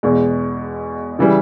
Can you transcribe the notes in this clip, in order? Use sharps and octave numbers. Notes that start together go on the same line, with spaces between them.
E2 B2 G#3
C#3 E3 G3